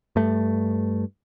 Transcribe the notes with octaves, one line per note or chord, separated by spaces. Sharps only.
G2 A3